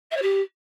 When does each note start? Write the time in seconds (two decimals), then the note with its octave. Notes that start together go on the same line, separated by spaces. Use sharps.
0.11 E5
0.16 C#5
0.21 G4